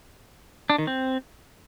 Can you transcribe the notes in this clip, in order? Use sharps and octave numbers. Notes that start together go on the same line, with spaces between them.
D4
D#3
C4